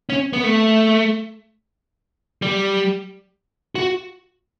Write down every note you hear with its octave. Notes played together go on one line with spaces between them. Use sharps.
C#4
B3
A3
G3
F#4